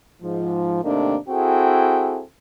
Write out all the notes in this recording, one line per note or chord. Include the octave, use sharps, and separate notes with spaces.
G#2 F3
D#2 C3 D#3 A3 A#3 D4
C4 E4 F#4 G#4 A4 G5